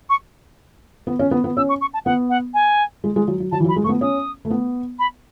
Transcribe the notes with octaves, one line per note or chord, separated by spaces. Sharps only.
C#6
B3
C#4
B3
B3
C#4 E6
C#6
C#6
A5
B3 F#5
F#5
G#5
G#3
G#3
F#3
F#3
F#3 A5
E3
F#3
B5
G#3
A3 C#6
B3
C#4 D#6
A3
B3
B5